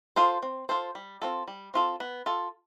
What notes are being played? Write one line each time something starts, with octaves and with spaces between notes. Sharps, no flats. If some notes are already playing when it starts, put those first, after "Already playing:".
F4 A4 C5
C4
F4 A4 C5
G3
C4 F4 A4
G3
C4 F4 A4
B3
F4 A4